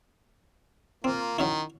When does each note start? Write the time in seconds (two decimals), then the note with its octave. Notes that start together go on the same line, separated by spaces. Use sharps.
1.04 A#3 C4 F4
1.38 D#3 F#3 C#4 E4